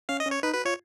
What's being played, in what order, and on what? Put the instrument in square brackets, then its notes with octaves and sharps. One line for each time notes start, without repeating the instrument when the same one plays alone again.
[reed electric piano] C#4 [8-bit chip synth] F5
[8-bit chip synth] D#5
[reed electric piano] C#4
[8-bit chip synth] C#5
[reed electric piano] D#4 [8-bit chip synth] B4
[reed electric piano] F#4 [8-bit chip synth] B4
[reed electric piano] F4 [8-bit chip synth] C#5